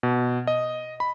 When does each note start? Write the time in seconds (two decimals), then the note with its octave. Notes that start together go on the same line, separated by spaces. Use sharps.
0.03 B2
0.47 D#5
1.00 B5